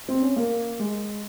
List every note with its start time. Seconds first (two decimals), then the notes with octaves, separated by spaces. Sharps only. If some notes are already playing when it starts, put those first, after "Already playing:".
0.08 C4
0.22 C#4
0.36 A#3
0.79 G#3